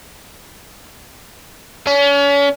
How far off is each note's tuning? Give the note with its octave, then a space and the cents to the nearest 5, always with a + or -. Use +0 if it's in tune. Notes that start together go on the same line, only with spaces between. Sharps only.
C#4 +35